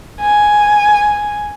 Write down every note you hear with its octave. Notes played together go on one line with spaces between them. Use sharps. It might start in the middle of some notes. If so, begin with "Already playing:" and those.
G#5